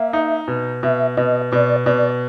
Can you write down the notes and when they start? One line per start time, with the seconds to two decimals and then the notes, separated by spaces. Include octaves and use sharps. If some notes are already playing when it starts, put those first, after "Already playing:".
Already playing: A#3 E5
0.13 D#4
0.48 B2
0.83 B2 E5
1.17 B2 D#5
1.52 B2 D5
1.86 B2 D5